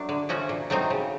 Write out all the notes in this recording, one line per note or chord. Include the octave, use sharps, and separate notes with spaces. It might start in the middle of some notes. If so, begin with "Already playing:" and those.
Already playing: F#3 A3 D4
D3
F3 A3 C#4 F#4
A#2
F#3 A3 C4 D#4
C#3